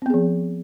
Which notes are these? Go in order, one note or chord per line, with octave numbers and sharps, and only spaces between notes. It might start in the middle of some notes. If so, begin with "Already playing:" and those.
F3 B3 C4 G#4